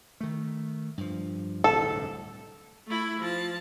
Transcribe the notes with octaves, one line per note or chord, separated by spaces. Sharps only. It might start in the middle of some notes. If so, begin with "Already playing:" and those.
D#3 A3
G2 F3
D1 C2 G2 A4
A3 E4
F3 A5